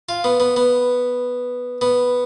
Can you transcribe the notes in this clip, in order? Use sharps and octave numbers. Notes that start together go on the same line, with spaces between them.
F4
B3
B3
B3
B3